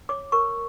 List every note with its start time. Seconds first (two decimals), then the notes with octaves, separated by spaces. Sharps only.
0.09 C#5 D6
0.32 A#4 C#6